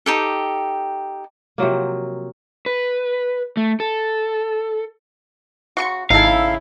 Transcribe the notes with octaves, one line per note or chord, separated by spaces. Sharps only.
D#4 G4 A4
C3 F3 F#3 A#3
B4
A3
A4
C#3 F#4 C6 C#6 C#7
G#1 C#3 D#4 E4 A4 F5 G#6